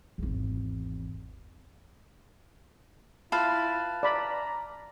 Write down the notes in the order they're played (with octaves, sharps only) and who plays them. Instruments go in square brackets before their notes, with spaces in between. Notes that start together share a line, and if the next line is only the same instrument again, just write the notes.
[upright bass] G#1 E2
[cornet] E4 [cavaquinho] F4 B4 [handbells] A5 F6 A6
[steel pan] D5 B5 [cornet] A#5